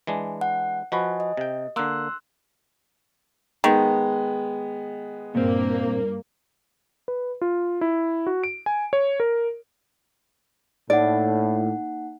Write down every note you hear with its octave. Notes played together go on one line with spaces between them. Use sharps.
E3 G#3 D4
F#5
F3 F#4 B4 D#5 G#5
D#5
C3 G5
D3 A#3 C6 E6 F#6
D#3 G#3 B3
G2 A#2 A#3 C4
B4
F4
E4
F#4
D7
G#5
C#5
A#4
A2 A#3 D#4 D5 F#5